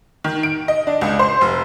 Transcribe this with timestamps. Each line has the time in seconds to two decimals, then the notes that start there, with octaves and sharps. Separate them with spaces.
0.24 D#3
0.43 D7
0.68 D#5
0.87 D4
1.01 C#2
1.19 C5
1.41 F1